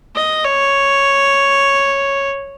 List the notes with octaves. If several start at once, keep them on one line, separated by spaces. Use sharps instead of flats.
D#5
C#5